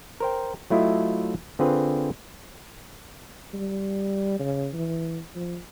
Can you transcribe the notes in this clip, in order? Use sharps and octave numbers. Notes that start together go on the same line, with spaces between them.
A#4 C5 G5
F#3 A3 E4 F4 D#5
D3 C4 F4 G#4 B4
G3
C#3
E3
F3